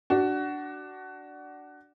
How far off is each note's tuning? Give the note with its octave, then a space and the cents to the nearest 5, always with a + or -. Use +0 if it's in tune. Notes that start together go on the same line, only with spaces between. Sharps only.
D4 +0 F#4 +20